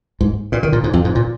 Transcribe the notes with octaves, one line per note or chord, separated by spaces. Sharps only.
G#2
A#2
D#3
A#2
G#2
F2
G#2
A#2